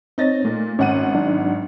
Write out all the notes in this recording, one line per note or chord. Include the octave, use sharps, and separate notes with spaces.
C4 D#4 C#5 A6 A#6
A#2 A3
G#1 C#4 F#5 D#7
F#3 D4 D#4